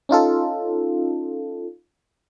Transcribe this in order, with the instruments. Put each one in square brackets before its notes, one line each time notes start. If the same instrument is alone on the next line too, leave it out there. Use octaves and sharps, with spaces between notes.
[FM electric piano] C#4 D#4 F4 A4